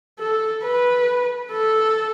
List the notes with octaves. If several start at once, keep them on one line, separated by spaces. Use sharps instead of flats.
A4
B4
A4